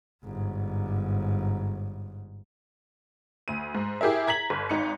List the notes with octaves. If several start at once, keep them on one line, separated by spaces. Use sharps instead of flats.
G1 G#2
D2 D#7
G#2
E4 G4 G#4 A#4 E5
A#5 G#6 B6 F#7
G1
G#1 D#4 C#7